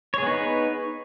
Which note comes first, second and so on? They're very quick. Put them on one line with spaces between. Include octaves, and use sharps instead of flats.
C#5 G#4 B3 D#4 B4